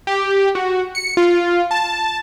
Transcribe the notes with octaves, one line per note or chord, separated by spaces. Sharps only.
G4
F#4
C#7
F4
A5